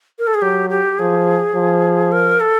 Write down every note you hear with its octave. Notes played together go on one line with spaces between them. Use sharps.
A#4
A4
G#4
F#3 G4
G4
F3 G#4
F3
A#4
A4